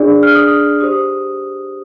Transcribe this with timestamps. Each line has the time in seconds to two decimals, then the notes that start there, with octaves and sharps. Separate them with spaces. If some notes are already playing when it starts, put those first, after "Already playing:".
Already playing: D4 G#4 D5
0.23 F6
0.35 D#6
0.80 G4 C5 D#6